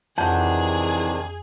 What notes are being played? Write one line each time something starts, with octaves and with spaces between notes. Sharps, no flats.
F2 C3 D#3 E3 D4 G#4 F#5 G6